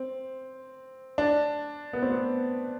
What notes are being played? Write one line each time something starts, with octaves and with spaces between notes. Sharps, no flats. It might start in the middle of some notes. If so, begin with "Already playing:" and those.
Already playing: C4
D4
B3
C4
B3